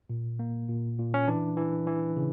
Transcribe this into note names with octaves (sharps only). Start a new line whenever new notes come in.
A#2
A#3
A#2
A#2
C#4
E3 D4
E3
E3
C#3